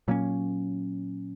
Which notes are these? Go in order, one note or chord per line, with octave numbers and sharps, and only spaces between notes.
A#2 F#3 A#3 C#4